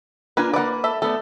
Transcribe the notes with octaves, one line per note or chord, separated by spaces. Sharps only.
A#3 D4 F4 B4 G#5
A#3 B4 D5 F#5
A4 E5
A3 B3 A4 D5